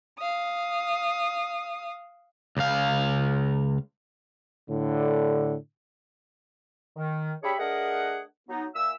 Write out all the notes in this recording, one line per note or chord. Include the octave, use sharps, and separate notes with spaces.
F5 D#6
C#2 F5
A2 D3
D#3
D4 G4 G#4 C#5 E5 B5
A3 D4 G#4 A#4 D#5 F#5
F#3 B3 D#4
A#2 E5 E6